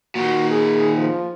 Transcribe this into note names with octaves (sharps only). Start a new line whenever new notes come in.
A#2 D#3 F#4
G#4
F3